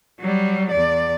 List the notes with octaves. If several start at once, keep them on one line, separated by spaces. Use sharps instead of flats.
F#3 G3
E2 D5